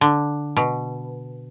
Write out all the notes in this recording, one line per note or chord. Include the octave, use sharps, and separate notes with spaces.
D3
B2